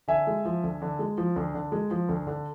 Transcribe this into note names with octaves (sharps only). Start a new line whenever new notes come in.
D3 E5 G#5
G#3
F3
D2
D3
G#3
F3
D2
D3
G#3
F3
D2
D3